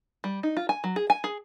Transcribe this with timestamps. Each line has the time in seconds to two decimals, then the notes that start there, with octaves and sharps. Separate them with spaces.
0.24 G3
0.43 D#4
0.57 F4
0.69 G#5
0.84 F#3
0.96 G#4
1.10 G#5
1.24 G#4